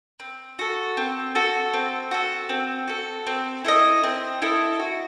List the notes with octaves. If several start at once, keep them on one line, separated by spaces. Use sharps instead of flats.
C4
F#4 A4
C4
F#4 A4
C4
F#4 A4
C4
F#4 A4
C4
E4 A4 D#5
C4
E4 A4 D#5
F#4